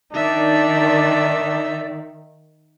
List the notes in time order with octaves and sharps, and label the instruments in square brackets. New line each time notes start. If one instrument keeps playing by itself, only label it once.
[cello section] D#3 [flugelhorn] D4 [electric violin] D#4 E5 [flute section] D5